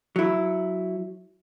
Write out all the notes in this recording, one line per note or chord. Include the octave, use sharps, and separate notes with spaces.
F#3 E4